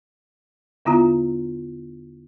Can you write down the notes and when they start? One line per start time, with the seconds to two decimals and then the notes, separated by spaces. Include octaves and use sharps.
0.85 E2 D3 B3 E4 F4 A#5